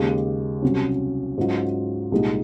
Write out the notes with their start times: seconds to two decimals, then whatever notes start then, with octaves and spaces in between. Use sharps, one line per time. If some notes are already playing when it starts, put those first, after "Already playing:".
Already playing: D#2 C#3 G#3
0.62 C2 C3 F#3 C#4
1.38 G#2 F#3 C#4 F4
2.12 C2 A#2 G#3 D#4